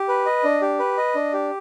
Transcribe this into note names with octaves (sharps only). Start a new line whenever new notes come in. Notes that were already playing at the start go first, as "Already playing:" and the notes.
Already playing: G4
B4
D#5
D4
G4
B4
D#5
D4
G4